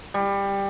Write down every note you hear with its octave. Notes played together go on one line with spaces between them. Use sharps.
G3